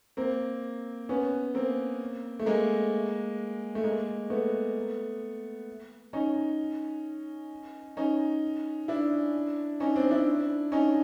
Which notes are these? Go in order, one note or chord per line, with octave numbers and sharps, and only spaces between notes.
A#3 C4
B3 C#4
A#3 C4
A3
G#3 A#3
A3
G#3 A#3
A3 B3
C#4 D#4
C#4 D#4
D4 E4
C#4 D#4
C4 D4
D4 E4
C#4 D#4